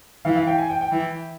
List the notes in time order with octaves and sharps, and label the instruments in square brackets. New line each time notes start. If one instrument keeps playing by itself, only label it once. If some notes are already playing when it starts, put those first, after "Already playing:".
[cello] E3 [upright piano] F5
[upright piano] F5
G5
G#5
G5
G5
[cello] E3